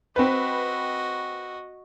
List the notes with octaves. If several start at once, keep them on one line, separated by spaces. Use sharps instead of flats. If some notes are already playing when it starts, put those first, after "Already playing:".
C4 F#4 B4 D#5